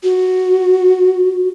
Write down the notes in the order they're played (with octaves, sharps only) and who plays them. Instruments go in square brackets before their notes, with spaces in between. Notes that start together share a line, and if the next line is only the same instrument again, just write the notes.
[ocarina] F#4